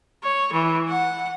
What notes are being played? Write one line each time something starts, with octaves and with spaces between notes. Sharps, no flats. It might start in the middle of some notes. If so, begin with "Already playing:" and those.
C#5
E3
F#5